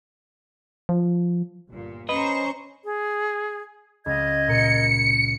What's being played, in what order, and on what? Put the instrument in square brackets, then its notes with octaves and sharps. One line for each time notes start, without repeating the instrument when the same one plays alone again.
[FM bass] F3
[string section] G1 A#2
[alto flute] C#4 [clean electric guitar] B4 D#5 [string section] C5 A#5 C#6
[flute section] G#4
[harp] C#2 F5 [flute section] D#5 G#6
[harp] A#2 A#4 D#7 [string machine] C#7